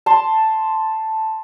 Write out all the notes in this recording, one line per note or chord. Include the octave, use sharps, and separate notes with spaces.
A5 C6